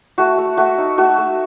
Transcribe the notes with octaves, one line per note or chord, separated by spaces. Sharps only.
A3 F#4
A3
A3 F#4
D#4
A3 F#4
A3